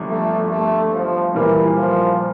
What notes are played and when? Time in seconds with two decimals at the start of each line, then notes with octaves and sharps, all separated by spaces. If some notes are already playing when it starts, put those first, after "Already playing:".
Already playing: G1 G2 F3
0.10 A3
0.51 A3
0.93 F3
1.35 A#2 E3 G3 A#3 F4
1.77 F3